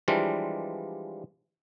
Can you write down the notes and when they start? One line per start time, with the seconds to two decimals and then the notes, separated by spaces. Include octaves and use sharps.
0.08 E3 F3 G3 G#3 D4 F4